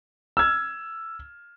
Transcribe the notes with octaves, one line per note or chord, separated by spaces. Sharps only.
E6 F6 G#6